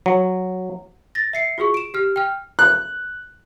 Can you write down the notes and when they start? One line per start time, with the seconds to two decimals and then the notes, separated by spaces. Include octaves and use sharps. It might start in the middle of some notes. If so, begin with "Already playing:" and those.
0.06 F#3
1.15 A6 A#6
1.33 E5 C7 C#7
1.58 F4 F#4 G#4 C#6
1.74 D7 E7
1.94 G4 F6
2.16 G5 F6
2.59 F#6